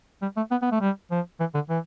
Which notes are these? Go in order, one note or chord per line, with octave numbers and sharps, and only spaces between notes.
G3
A3
B3
B3
A3
G3
F3
E3
D3
E3